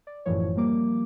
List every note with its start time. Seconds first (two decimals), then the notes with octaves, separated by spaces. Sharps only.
0.07 D5
0.26 G1 F#2 A2 E3 F3 C#5
0.55 F3 G3 A#3 D6